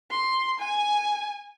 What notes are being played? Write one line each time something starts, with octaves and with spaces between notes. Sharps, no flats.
C6
G#5